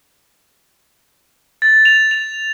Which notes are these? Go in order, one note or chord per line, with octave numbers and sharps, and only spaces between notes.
A6
F7
F7